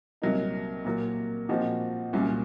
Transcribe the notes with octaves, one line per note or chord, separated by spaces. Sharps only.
C2 C3 F#3 A#3 D#4
A#2 F#3 A#3
A#2 F3 C4 D#4 F#4
C2 A#2 F#3 C#4